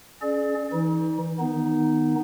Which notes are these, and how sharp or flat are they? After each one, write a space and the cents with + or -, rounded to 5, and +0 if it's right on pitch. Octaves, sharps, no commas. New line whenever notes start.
C#4 +10 G#4 +40 D5 +20
E3 -5 D#4 +35
D#3 +0 B3 +0 D#4 +0